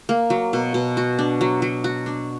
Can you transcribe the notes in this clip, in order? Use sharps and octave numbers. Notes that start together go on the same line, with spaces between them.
A#3
F#3
B2
B2
F#4
D4
F#3
F#3
F#4
D4